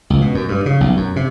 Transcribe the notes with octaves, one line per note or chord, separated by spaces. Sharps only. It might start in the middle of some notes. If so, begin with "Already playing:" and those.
C#2
B2
F#2
G2
C#3
B1
F#2
C3